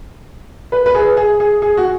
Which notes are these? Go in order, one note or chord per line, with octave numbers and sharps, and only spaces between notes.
B4
B4
G#4
G#4
G#4
G#4
F#4